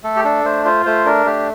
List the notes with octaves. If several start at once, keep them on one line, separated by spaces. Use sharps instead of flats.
A3 A4
G4
D4 A4
A3 C5
F4 C5
A3 C5
D4 A#4
A3 G4